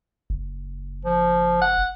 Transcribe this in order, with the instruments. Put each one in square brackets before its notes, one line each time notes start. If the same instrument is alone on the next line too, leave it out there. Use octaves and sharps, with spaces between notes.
[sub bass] F#1
[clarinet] F3
F#5